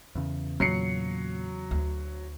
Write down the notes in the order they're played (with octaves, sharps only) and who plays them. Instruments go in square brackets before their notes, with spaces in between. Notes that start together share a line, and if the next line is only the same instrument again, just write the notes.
[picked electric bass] E2 C#3
[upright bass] A#2 [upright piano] F#3 C7 C#7
[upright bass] D2